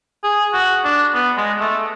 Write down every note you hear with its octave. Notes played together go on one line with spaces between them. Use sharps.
G#4
F#4
D4
B3
G#3
A3